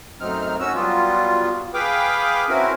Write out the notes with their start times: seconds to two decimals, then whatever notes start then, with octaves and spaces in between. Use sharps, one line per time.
0.21 F#2 A2 F#3 C4 D#4 F6
0.60 C#4 F#4 E6
0.75 F#3 G3 B3 F4
1.74 G#4 B4 F5 G5 D6
2.49 C4 C#4 E4 F#4 A#4